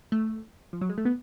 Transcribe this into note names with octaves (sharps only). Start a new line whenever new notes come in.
A3
F3
F#3
G#3
A3
B3